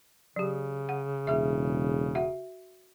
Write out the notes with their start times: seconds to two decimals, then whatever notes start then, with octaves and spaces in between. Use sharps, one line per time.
0.36 C#3 F#3 G4
0.89 F#5
1.27 E1 G#4 E5
2.15 F#4 E5 F#5